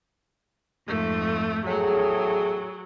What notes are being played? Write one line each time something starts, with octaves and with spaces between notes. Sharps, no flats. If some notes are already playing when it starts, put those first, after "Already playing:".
F2 G#2 A3
E2 A2 F#3 G#4